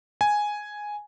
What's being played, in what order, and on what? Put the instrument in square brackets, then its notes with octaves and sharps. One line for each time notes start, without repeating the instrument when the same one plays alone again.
[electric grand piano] G#5